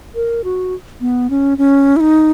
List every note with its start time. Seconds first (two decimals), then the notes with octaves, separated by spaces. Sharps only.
0.15 A#4
0.44 F#4
1.01 B3
1.30 C#4
1.58 C#4
1.96 E4
2.00 D#4